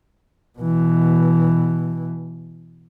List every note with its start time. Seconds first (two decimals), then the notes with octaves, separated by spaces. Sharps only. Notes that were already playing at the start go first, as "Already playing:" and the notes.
0.59 B2 E3